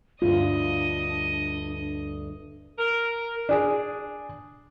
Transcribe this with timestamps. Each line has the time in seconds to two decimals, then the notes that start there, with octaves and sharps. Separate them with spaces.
0.22 D2 G2 D3 D4 F4 D#5 D#6
2.79 A#4
3.49 D4 G#4